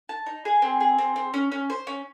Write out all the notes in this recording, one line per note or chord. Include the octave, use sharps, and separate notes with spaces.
A5
D#4
G#4
C4
G#4
C4
C4
C#4
C#4
C5
C#4